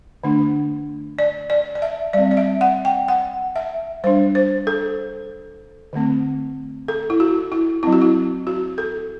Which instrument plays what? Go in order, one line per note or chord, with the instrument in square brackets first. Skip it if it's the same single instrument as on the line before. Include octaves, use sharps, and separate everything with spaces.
[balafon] D3 A3 D4
D5
D5
D5
E5
G3 C4 D5
D5
E5
F#5
G5
F#5
E5
G3 D4 C5
C5
A4
D3 A3 C4
A4
E4
F#4
E4
F#3 C4 E4
F#4
E4
F#4
A4